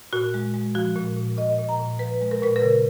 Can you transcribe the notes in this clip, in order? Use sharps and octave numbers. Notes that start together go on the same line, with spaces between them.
A#2 F#4
G#3
G#3
F3 F#4
A#2
A#2
A#2 D#5
A#2
A#5
A#2
F3 B4
G#3
A#4
A#2 B4
A#4
C#3